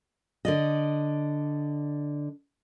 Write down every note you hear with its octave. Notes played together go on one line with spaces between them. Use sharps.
D3 D5 D#5